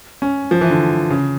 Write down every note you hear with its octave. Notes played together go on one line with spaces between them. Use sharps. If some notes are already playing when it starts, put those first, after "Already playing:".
C#4
F3
E3
D3
C#3